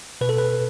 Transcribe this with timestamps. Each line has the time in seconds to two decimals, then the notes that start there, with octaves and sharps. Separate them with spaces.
0.21 B2 B4
0.29 A4
0.38 B4